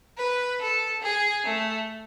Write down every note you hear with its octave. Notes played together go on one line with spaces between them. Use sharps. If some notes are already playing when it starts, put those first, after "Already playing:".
B4
A4
G#4
A3